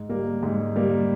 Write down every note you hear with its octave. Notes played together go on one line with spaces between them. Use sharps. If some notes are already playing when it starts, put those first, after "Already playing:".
Already playing: G#2
G3 A#3
G#2
G3 A#3